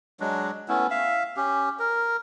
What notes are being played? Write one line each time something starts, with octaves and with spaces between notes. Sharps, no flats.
F#3 G#3 D4
A3 B3 C#4 E4
E5 F5
C#4 G4
A#4